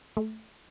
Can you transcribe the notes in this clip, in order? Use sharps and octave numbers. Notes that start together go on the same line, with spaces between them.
A3